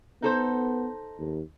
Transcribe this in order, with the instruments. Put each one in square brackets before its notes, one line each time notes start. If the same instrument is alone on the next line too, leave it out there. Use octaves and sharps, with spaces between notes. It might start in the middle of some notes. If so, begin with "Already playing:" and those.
[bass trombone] B3 [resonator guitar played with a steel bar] D#4 A4 C5
[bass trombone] D#2